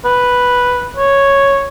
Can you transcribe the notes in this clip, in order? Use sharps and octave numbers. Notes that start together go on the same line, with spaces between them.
B4
C#5